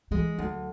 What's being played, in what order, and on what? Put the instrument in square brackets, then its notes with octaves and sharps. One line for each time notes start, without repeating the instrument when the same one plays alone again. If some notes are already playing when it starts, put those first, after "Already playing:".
[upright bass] E3 [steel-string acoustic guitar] G#3
[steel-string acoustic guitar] D2 [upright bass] F#3